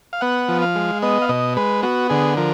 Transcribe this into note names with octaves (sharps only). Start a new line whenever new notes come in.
F5
B3 F#5
F3
F5
G#3
B3 D#5
F5
B2 D#5
G#3 B4
B3 F#4
D3 G#4
F3 A#4